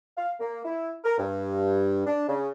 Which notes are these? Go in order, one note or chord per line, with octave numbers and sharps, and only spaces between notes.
F5
A#3
E4
A#4
G2
D4
C#3